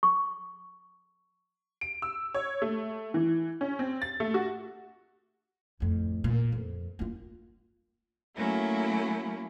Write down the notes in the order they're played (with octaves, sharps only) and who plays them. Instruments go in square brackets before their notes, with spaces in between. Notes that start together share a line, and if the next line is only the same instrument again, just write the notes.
[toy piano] C#6
[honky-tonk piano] D7
E6
C#5
A3
E3
C#4
C4
A6
A3
F#4
[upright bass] F2 A2
A#2
F2
A#3 F4
[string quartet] F#3 A3 A#3 C#4 E4